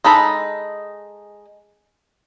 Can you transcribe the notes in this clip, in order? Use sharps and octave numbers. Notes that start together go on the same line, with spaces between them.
G#3 D#4 A4 B5